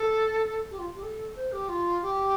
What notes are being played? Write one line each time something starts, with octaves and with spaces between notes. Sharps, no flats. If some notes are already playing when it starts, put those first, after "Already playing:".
Already playing: A4
G4
F4
G4
A4
C5
G4
F4
G4